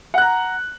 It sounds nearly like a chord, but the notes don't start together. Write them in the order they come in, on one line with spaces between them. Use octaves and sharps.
F#5 F#6 A#5